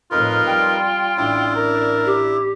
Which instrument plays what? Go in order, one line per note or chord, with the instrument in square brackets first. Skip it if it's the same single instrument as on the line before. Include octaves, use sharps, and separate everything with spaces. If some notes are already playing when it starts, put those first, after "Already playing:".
[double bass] F2 A2 [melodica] D#4 A#4 B4 [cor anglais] F4
[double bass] G3 [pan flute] G5
[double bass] A1 D4 [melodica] E4
[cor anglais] A#4
[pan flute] G4